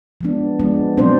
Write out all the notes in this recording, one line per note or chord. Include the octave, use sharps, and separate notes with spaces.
F3 G#3 B3 D4
F3 G#3 B3 D4
B2 F#3 B3 C4 D4 C5